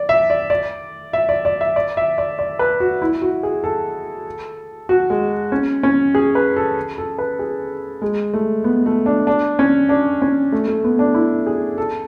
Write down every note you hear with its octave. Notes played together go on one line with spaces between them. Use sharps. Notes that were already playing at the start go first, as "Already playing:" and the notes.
Already playing: D5
E5
D5
D5
E5
D5
D5
E5
D5
E5
D5
D5
B4
F#4
E4
F#4
G#4
A4
F#4
G#3
C#4
C#4
G#4
B4
A4
A4
B4
G#4
G#3
A3
B3
A3
D4
D4
C#4
D4
C#4
A3
A3
B3
D4
E4
G#4
A4